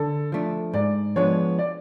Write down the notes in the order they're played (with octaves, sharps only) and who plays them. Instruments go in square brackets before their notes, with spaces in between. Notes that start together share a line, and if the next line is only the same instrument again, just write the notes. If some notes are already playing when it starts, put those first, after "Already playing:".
Already playing: [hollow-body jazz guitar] D3 [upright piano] A4
[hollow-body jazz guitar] F3 A3 D4
[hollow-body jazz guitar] G#2 [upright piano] D5
[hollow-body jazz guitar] F3 G#3 B3 D4 [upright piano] C#5
[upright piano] D5